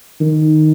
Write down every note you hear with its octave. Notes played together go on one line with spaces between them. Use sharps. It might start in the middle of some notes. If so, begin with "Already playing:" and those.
D#3